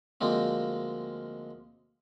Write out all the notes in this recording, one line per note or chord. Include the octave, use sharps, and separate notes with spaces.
D2 F3 G#3 A#3 C4